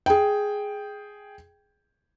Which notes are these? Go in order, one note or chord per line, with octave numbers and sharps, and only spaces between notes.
G#4 G5